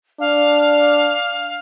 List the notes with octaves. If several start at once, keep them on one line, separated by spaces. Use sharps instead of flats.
D4 F5